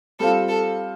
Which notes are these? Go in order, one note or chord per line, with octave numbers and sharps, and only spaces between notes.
G3 C4 F4 A4
A4